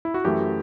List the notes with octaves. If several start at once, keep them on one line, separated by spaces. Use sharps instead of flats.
E4
F#4
F#2 E3 A3 G4